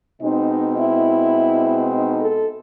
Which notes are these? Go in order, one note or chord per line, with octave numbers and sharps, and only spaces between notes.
B2 G#3 C4 D#4
E4
D#4
A4